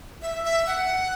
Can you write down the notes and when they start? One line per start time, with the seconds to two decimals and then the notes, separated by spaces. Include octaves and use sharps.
0.22 E5
0.45 E5
0.67 F#5